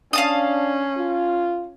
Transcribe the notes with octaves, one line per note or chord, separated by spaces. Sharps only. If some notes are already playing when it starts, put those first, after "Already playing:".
C#4 D4 F5 A5 D#6
F4